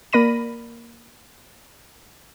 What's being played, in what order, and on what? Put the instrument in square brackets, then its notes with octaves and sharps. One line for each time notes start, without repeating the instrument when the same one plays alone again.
[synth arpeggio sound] A#3 A#4 D5 B5 A#6 D#7